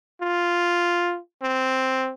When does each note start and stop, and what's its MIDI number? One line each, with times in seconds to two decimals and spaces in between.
0.21 1.18 65
1.42 2.12 60